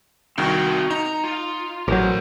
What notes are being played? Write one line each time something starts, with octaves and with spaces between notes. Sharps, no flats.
C2 D#3 C4 F#4 A#4
D#4 A#5
F4
A1 F#3 A#4 C5